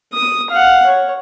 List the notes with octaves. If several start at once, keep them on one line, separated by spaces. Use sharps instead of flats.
D#6
F5 F#5
C#5